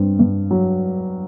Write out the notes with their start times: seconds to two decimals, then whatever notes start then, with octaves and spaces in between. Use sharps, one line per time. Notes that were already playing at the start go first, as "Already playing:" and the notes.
Already playing: G2 C4
0.19 G2
0.51 F#3